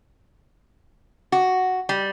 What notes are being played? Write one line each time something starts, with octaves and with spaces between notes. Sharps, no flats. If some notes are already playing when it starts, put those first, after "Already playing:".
F#4
G3